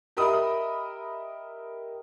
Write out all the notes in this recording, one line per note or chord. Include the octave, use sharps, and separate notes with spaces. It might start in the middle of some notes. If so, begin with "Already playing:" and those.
G4 A#4 D#5 E5 B5 D#6